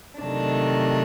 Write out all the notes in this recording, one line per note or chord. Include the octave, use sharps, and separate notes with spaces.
C3 D#3 F#3 A3 D4